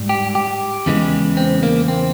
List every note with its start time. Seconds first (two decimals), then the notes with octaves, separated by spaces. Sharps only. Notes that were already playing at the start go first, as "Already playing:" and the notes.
Already playing: G#2 G3
0.09 G4
0.35 G4
0.86 E2 C#3 E3 G#3
1.37 C4
1.63 A#3
1.88 C4